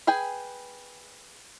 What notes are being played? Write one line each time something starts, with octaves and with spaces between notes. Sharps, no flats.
G#4 B4 G5 G#5